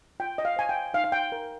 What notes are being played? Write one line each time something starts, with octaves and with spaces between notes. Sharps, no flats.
F4 G5
D#5
F5
C5 G#5
G5
D#4 F5
F5
G5
A#4